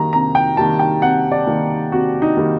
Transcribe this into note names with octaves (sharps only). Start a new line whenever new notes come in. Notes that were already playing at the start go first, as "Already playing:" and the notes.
Already playing: D#3 G3 A#3 A#5
C3 A#5
G5
D#3 G3 A#3 A5
G5
C3 F#5
D5
D#3 G3 A#3
C3 F#4
D#4
D#3 G3 A#3